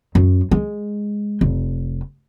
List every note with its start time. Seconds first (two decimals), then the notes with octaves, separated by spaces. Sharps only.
0.15 F#2
0.51 G#3
1.41 F1